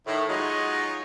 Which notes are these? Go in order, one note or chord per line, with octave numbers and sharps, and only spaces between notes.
A2 D#3 E4
F#3 G#3 D#4 F4 F#4 C#5